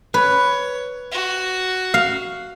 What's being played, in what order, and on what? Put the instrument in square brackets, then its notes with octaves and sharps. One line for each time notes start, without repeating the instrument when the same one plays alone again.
[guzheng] B4 [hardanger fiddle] C#5
[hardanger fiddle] F#4
[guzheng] F5